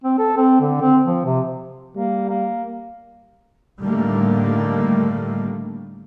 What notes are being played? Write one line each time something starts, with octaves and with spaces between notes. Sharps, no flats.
C4
A4
C4
D3
C4
F3
C3
G3 A#3
A#3
A2 D3 D#3 G3 A3 A#3